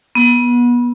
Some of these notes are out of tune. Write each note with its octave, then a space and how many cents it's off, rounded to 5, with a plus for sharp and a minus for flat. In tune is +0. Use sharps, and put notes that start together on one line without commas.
B3 -30